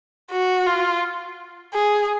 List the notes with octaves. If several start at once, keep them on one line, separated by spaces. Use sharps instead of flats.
F#4
F4
G#4